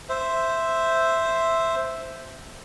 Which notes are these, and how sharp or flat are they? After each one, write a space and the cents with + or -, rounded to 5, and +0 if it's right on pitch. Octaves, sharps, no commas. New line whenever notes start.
C5 -5 E5 +0